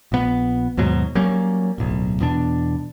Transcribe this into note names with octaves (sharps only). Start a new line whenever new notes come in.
A#1 B3
D#2 G#2 B2 F#3
F#3 G3 A#3 C#4
D1 B1
E2 B2 D4